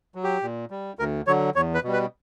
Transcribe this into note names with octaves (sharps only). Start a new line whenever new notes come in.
F#3
G4
A#2
G3
D2 A#4
D3 F#3 C#5
E2 C#5
B4
B2 G3
B4